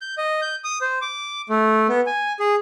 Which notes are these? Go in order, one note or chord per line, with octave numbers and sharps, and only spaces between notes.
G6
D#5
G6
D#6
C5
D6
A3
B3
G#5
G#4